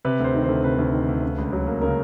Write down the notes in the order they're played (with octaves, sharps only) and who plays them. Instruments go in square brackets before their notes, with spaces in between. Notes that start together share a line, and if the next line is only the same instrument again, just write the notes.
[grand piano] C3 B4
D2 C5
D#3
D2 C5
C3 B4
D2
D#3
D2
C#3
C#2
F#3
A#3
C#3 A#4